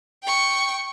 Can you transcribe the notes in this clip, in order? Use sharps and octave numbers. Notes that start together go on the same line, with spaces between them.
G5 C#6